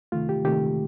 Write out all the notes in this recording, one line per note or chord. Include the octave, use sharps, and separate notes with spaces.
C3 D#3 A3 F4
G4
C3 D#3 A3 G4